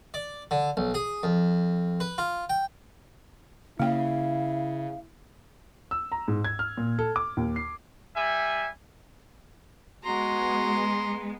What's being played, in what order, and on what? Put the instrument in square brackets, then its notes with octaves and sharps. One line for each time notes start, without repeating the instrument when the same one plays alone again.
[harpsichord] D5
D3
B1
G#4
F2
B4
F4
G5
[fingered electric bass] C#3 C#4 [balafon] A#3 G5 [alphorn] E4 [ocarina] F5
[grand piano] E6
A#5
G#2
G#6
F6
A#2
A4
D6
D#2
C7
[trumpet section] G3 E5 G#5
[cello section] G#3 B3 [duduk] F#4 [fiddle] A#5 [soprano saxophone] C6